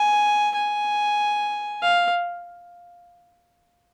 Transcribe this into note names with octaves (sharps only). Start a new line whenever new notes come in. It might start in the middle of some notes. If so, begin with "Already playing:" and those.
Already playing: G#5
G#5
F5